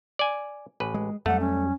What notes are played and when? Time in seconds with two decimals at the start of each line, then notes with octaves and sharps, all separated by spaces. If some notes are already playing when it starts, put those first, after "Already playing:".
0.19 D5 G#5
0.80 A1 B4
0.94 G#3
1.26 F2 F#3 G3 A3 F#5
1.40 C#4